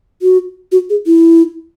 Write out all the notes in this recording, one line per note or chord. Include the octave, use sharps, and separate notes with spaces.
F#4
F#4
G#4
E4